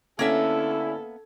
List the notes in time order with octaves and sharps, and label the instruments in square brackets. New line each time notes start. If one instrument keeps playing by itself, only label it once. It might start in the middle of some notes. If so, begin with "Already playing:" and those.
[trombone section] D3 E4 [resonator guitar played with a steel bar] A#3 B3 E5 [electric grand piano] C#4 G#6 [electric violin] A4